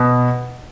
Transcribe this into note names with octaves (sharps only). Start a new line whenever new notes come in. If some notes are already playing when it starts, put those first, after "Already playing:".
Already playing: B2